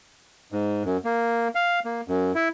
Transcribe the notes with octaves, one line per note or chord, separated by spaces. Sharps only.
G#2
F#2
A#3
F5
A#3
F#2
E4